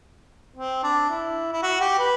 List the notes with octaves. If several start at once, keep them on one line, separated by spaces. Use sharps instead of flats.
C4
D4
E4
E4
F#4
G4
B4